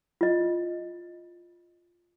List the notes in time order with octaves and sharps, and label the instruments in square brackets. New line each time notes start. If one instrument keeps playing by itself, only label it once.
[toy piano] F4 D#5